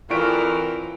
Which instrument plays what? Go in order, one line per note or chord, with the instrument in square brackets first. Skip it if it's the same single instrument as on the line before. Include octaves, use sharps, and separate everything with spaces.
[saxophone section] F2 A#4 [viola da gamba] E3 [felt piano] F4 B6 D7 [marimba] D5 C#6